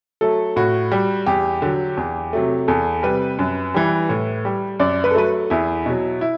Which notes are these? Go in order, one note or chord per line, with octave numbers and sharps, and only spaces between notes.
F#3 A3 A4
A2 F#4
G3
E2 G4
D3 F#3
E2
C3 F#3 A3
E2 A4
C3 G3 B4
F#2
E3 G3
A2
G3
F#2 D5
B4
A4
F#3 A3 B4
E2 E4
B2 F#3
E4